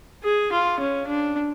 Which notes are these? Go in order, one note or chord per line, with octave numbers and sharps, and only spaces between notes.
G#4
F4
C#4
D4